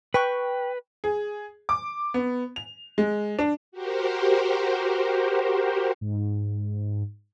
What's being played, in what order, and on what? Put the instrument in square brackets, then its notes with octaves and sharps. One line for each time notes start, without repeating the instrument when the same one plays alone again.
[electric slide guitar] B4 [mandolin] G5 C#6 F#6
[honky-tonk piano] G#4
D6
B3
F7
G#3
D4
[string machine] F#4 G4 A#4 C5
[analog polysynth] G#2